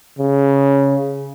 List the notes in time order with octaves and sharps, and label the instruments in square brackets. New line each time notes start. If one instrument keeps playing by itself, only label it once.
[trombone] C#3